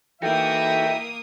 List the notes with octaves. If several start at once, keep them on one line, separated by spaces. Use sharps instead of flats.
E3 A#3 D#4 F#4 A4 E5 G5 D#6